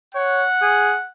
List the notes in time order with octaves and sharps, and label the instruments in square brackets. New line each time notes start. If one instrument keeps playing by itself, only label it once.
[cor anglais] C#5 [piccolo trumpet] F#5
[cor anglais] G#4